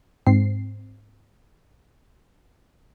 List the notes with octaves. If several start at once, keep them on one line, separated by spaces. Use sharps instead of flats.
G#2 C4 C7